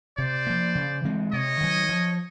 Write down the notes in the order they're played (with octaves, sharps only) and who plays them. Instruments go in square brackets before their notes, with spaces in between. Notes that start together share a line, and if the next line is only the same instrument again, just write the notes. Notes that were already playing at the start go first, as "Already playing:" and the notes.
[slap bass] C3 [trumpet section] C5 D5
[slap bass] F3 A#3
C#3
E3 G#3 C4
[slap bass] C3 [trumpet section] C#5 D#5
[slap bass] D#3 F#3
F3